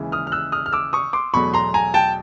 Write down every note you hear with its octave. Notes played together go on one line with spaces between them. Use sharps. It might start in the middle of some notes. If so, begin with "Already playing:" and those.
Already playing: D#2 C#3 E3 G#3
D#6 F6
F6
E6 F#6
D#6 F6
F6
D6 E6
C#6 D#6
C6 D6
E2 B2 F#3 A3 B5 C#6
A#5 C6
G#5 A#5
G5 A5